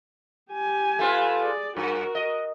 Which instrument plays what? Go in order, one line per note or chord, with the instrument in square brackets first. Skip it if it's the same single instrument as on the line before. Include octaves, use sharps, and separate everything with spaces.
[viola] G4 G#5
[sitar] A3 F4 B4
[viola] G#4 D5
[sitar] G2 [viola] F#4 A#4
[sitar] D#5